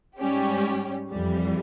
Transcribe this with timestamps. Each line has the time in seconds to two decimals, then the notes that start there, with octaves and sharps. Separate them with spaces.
0.17 G#2 G3 C#4 G4
1.09 F2 E3 G3